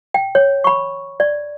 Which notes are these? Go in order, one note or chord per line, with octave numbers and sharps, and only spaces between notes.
G5
C#5
B5 C#6
D5